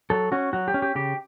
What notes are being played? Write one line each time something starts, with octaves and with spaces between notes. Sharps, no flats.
F#3 A4
C#4 F#4
F#3 F#4
G4
C#4
G4
C#3 G4